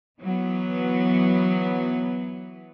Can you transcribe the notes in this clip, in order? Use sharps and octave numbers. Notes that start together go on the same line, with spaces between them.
E3 F#3 B3